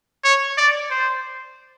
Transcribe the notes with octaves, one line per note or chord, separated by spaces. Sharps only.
C#5
D5
C5